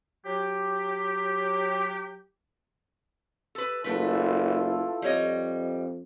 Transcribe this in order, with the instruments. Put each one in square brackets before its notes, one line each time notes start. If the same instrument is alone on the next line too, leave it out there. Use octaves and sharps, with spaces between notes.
[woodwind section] F#3 G4
[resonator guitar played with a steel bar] A4 B4
[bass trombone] F#1 [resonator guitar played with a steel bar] A3 B4 [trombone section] E4 F4 A4
[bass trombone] F2 [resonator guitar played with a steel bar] G3 C#5 D#5